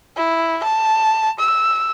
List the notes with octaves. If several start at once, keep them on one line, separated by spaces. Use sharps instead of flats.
E4
A5
E6